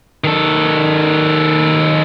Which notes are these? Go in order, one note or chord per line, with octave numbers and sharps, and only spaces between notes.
D#3 A4